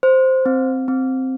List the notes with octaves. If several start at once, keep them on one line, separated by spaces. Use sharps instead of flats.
C5
C4
C4